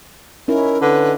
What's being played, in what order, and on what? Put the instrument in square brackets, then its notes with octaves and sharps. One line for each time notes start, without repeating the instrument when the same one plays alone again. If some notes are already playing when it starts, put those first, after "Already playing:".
[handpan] C#4 D#4 E4 [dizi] A#4
[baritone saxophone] D3 [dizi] B4